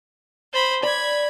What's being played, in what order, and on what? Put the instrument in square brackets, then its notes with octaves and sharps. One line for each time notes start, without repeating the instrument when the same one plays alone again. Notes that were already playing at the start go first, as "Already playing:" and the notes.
[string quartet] C5 B5
[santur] D5 [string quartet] B5 G#6